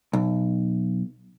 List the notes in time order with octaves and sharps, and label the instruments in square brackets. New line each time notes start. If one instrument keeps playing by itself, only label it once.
[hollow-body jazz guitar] B1